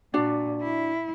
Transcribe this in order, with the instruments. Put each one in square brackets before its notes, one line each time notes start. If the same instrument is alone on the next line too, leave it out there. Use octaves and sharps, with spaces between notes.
[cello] A#2 [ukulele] D4 F#4 D5
[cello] E4